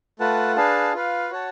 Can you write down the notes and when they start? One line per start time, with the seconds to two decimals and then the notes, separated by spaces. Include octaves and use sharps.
0.19 A3 F4 B4 F#5 A5
0.56 D4 G#4 B4 F5 A5
0.94 F4 B4 F5
1.30 F#4 C#5 F#5 A5